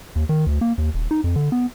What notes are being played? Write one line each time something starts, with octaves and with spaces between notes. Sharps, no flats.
D#2
D#3
D2
A#3
D#2
D#1
D#4
F2
D3
B3